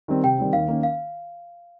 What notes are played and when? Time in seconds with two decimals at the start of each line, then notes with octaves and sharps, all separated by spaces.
0.08 D#3 G3 C4
0.24 C3 G5
0.38 D#3 G3 C4
0.53 D#2 F5
0.68 D#3 A#3 C#4
0.83 F5